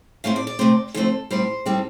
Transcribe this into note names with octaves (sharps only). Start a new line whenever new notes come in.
A2 A3 C4 F5
D5
D5
C3 A3 C4
D3 F3 A3 C4 A4
A2 G3 C4 C5
A2 G3 C4